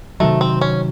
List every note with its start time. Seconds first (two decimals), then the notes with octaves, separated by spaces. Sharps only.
0.20 C3 D#3 F#3 A3
0.41 C4
0.61 C#4